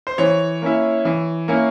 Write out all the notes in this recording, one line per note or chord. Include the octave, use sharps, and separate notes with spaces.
C5
E3 C#5
A#3 C#4 E4
E3
A#3 C#4 E4